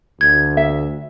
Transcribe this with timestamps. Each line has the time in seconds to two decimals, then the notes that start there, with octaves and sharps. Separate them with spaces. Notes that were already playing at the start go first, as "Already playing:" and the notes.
0.21 D2 G#6
0.57 E5